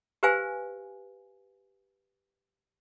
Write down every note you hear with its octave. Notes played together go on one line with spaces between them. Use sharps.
G4 B4 C5 F5 G#5